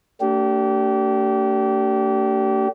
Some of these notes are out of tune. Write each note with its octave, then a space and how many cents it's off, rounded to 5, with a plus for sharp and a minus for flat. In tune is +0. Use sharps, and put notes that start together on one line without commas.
A3 +35 D4 -30 G4 -30